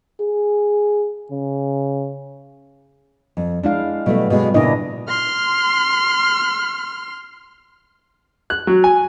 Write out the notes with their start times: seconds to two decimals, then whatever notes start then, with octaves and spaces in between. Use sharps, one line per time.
0.20 G#4
1.31 C#3
3.37 F2
3.63 G#3 D4 E4 F5
4.06 B2 F#3 G3 A3 B3
4.30 B2 G#3 B4
4.54 A#2 C#3 D4 E4 D#5
5.08 C6 F6
8.50 F#6
8.67 F#3
8.84 G#5